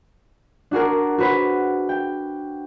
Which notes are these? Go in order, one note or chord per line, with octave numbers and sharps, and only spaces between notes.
D4 F#4 G#4 A#4
F#4 B4 C5
G5